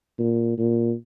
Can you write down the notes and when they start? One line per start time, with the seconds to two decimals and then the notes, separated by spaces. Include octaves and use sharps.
0.19 A#2
0.58 A#2